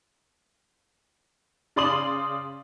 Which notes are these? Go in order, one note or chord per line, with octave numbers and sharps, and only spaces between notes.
C#3 D5 C6 D#6 F#7